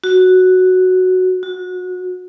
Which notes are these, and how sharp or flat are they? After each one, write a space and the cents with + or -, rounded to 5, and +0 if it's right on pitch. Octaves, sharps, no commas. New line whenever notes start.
F#4 +0
F#4 -25